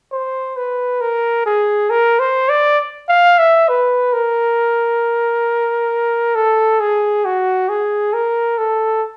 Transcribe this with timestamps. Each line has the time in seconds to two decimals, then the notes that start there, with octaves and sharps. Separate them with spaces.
0.12 C5
0.56 B4
1.01 A#4
1.46 G#4
1.90 A#4
2.19 C5
2.49 D5
3.08 F5
3.39 E5
3.69 B4
4.13 A#4
6.35 A4
6.80 G#4
7.25 F#4
7.69 G#4
8.14 A#4
8.58 A4